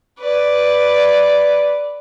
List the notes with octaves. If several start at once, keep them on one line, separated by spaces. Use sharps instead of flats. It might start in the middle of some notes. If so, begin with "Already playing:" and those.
B4 D5